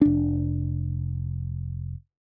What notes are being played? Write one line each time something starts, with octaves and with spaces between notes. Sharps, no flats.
F1 D4